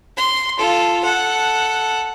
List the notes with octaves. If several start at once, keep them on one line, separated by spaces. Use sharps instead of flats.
C6
F4 A4
A4 F#5